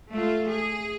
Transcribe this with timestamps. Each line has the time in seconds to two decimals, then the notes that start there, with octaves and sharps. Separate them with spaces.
0.11 A3 F4
0.47 G#4